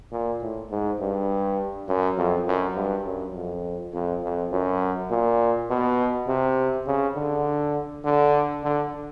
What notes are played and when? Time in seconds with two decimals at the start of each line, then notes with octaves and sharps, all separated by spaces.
0.12 A#2
0.42 A2
0.71 G#2
1.00 G2
1.88 F#2
2.18 F2
2.48 F#2
2.76 G2
3.05 F#2
3.34 F2
3.93 F2
4.24 F2
4.52 F#2
5.11 A#2
5.70 B2
6.28 C3
6.87 C#3
7.16 D3
8.04 D3
8.63 D3